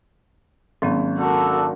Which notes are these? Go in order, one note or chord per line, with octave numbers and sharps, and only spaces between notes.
G#1 F#3 A#3 C#4
D4 F#4 A4 A#4